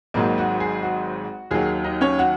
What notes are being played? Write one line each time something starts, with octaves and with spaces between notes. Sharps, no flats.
G#1 G#2 D#3 F#3 A#3 A#4
F#4
G#4
F#4
D#2 D#3 F#3 G#4
D#4 D#5
C#4 C#5
F#4 F#5